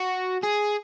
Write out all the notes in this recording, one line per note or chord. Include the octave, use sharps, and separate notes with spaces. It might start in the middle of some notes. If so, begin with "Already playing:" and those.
Already playing: F#4
G#4